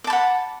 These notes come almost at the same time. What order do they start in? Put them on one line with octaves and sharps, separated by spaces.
D6 A5 B5 F#5